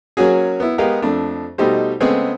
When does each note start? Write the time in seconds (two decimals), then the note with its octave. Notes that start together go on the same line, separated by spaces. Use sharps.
0.17 F#3 A#3 C#4 F#4 G#4
0.60 B3 E4
0.78 G#3 B3 G4 A#4 B4 F5
1.02 F2 A3 D4
1.58 B2 G3 A3 D#4 G4 C5
2.00 C#3 G#3 A3 B3 C4 G#4